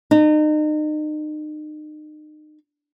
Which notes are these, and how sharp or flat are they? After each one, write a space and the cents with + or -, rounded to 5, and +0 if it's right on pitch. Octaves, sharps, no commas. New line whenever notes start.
D#4 -35